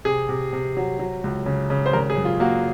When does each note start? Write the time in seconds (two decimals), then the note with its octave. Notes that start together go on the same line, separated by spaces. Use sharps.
0.05 C3 G#4
0.29 C3
0.53 C3
0.77 F#3
0.99 F#3
1.24 C#2
1.46 C#3
1.70 C#3
1.86 C5
1.93 G#1 A#4
2.10 G#4
2.16 F#2
2.25 F4
2.40 A#3 F#4